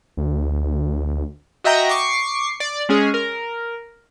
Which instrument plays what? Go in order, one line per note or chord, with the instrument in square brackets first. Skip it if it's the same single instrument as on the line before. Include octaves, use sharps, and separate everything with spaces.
[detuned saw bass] D2
[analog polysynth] F#4 D#5 E5 G5 A#5
C#6 D6 C7
D5
G#3 C#4 G#4
A#4